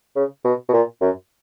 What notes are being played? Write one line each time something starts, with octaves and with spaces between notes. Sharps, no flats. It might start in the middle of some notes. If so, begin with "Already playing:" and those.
C#3
B2
B2
A#2
F#2